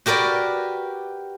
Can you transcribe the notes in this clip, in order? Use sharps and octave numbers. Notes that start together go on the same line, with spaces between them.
F#4 G4 A#4 B4 D5